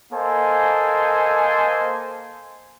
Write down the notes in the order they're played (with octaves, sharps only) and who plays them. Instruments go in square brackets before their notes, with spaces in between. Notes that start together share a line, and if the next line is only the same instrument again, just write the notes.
[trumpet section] A#3 A4 C5 D#5 G#5